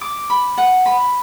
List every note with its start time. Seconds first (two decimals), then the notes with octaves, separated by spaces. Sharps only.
0.01 D6
0.30 B5
0.58 F#5
0.86 B5